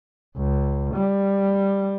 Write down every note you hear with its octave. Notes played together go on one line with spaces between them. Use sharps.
C#2
G3